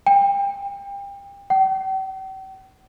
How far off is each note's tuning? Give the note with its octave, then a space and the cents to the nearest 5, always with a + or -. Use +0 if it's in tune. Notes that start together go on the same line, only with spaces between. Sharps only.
G5 +30
G5 -45